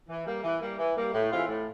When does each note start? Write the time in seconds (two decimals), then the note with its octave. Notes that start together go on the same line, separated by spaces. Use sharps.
0.08 E3
0.26 G3 A#3
0.43 E3
0.60 G3 A#3
0.78 E3
0.96 G3 A#3
1.13 A2
1.31 E3 G#3 C4 F4
1.48 A2